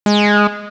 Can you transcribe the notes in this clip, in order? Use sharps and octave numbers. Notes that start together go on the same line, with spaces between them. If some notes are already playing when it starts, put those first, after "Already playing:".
G#3